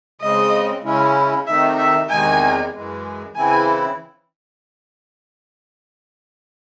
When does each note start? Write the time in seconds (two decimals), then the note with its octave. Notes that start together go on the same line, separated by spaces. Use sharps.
0.21 C#3 G#3 C4 D#5
0.84 C#3 G#3 C#4 E4
1.47 C3 D#3 A3 D#4 E5
1.78 E5
2.10 E2 C3 D#3 G#3 D#4 G#5
2.72 F#2 E3 G#3
3.35 C#3 E3 C4 E4 G#5